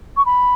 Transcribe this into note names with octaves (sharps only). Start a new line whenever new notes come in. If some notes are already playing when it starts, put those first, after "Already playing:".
C#6
B5